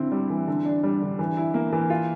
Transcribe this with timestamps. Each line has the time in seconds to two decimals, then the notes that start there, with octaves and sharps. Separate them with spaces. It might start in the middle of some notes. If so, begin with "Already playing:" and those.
Already playing: D3 C4 E4
0.12 G3
0.30 E3
0.48 D3
0.65 D4
0.83 G3
1.02 D3
1.19 E3
1.37 E4
1.54 A#3
1.73 E3
1.90 F4